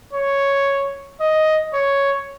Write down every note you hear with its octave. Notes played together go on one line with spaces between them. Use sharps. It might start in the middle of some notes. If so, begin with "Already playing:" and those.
C#5
D#5
C#5